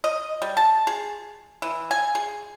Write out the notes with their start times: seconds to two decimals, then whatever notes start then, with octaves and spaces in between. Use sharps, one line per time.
0.04 D#5
0.42 G3
0.57 A5
0.87 G#4
1.62 E3
1.91 G#5
2.15 G#4